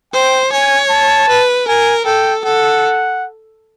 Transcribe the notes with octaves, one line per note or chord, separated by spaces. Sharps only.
C5 G5
C#5 G#5
A5
B4
A#4 G#5
A4 G5
A4 F#5